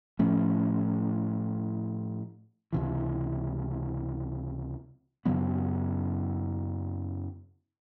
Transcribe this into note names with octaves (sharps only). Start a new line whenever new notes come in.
A2 F3 A3 C#4
C#2 C3 E3
F#2 C#3 F#3 B3